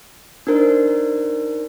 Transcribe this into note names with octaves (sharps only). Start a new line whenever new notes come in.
D4 D#4 A#4 C5